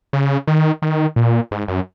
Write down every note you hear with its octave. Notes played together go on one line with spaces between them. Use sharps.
C#3
D#3
D#3
A#2
G#2
F#2